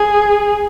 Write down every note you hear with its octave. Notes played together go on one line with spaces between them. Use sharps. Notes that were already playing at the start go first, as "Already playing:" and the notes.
Already playing: G#4